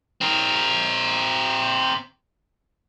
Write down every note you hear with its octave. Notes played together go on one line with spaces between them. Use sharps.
C4 A#4